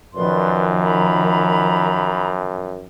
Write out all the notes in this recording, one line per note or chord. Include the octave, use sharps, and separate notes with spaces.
F#2 D#3 F3 B4 D5 C6
A#5 B5